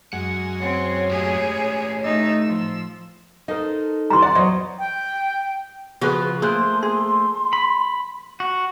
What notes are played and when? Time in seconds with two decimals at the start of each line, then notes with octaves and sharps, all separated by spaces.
0.13 F#2 G#3 F#5
0.60 C4 C#5
1.11 A2 G4 G#4
2.04 A3 D#4 E6
2.46 F3
3.48 D#4 A4 A#4 C5 D#5
4.10 E3 G3 A#5 C6
4.22 D5 F#5
4.35 E2 F#3 C5 C#5 D#5
4.79 G5
6.01 C#3 F3 F#4 G#4 B4
6.42 A3 A#3 G#4 C5 C6 F#6
6.83 G#4 C6
7.53 B5
8.40 F#4 F#5